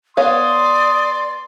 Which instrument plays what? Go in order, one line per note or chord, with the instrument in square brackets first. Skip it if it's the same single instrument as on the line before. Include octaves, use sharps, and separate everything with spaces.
[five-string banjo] B3 C#5 F5 [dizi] D5 [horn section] C6 [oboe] D#6